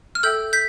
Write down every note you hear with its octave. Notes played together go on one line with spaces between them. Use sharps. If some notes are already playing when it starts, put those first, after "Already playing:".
F6
A4 E5 G5 E6 G6
G6 B6